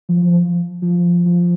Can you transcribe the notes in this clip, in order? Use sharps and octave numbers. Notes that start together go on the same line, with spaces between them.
F3
F3
F3
F3